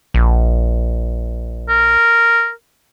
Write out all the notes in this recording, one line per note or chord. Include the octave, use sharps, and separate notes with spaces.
A#1
A#4